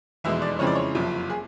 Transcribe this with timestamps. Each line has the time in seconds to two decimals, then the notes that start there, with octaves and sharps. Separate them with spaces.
0.24 F1 E2 B2 G#3 E5
0.42 D5
0.59 F2 C#3 E3 G#3 C4 C#5
0.67 D5
0.75 C#5
0.95 F#1 F2 C3 F3
1.30 G#4